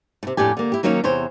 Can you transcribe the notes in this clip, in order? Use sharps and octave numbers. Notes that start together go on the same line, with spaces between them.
A2 C3
F2 A2 D4 G4 G#5
D3 A#3
E4 G4
D#3 F#3 A#3 C#4 D#4 C#5
E2 C3 C5 C#5